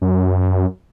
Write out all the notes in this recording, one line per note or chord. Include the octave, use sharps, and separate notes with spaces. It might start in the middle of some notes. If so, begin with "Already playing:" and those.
F#2